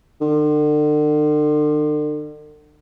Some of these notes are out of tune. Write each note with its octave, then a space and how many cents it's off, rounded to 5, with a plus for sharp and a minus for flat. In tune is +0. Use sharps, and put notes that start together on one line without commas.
D3 +40